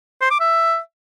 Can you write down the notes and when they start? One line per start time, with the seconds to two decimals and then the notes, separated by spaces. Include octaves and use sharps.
0.21 C5
0.30 D6
0.40 E5